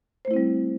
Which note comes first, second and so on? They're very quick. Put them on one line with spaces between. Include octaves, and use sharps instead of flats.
C5 A3 E4 C4 G3